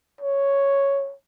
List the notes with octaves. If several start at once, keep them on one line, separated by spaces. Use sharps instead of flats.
C#5